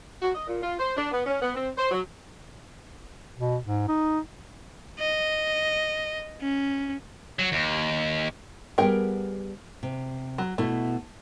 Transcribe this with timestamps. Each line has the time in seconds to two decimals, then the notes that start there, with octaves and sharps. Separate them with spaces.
0.22 F#4
0.34 D#5
0.47 A#2
0.62 F4
0.79 C5
0.96 D4
1.11 B3
1.26 C#4
1.42 B3
1.55 C4
1.78 C5
1.91 F#3
3.38 B2
3.65 G#2
3.88 D#4
5.00 D#5
6.41 C#4
7.39 F#3
7.52 D#2
8.78 G3 B3 G#4 A#4 G5
9.83 C3
10.38 F#3
10.58 B2 A3 E4